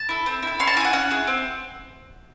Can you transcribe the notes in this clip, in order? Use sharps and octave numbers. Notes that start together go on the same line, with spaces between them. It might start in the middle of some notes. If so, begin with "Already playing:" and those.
Already playing: A5
E4 A4
C4
E4 A4
C#4 C6
A5
E4 G#4 F#5 G#5
C#4 F#5
E4 G#4
C4